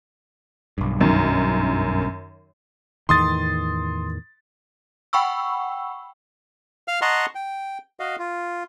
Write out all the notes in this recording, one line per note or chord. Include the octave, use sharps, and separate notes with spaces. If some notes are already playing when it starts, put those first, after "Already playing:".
B1 G2
F#2 D#3
E2 A2 D#3 C6 D#6 A6
F#5 G5 B5 C#6 E6
F5 F6
D#5 F#5 A5 A#5 C6 C#6
G5
F#4 D#5 F5
F4